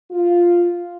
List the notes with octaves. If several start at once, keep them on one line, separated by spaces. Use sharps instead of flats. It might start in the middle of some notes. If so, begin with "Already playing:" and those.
F4